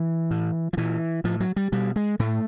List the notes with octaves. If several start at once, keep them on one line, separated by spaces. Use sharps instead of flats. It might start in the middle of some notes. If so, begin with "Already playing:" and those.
Already playing: E3
A2
F3
A#2 E3
A2 F3
F#3
G3
B2 G3
G#3
A2 A3